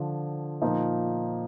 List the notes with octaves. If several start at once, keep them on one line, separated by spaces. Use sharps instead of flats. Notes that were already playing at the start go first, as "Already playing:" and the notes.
Already playing: D3 F3
A#2 F3 A#3 D#4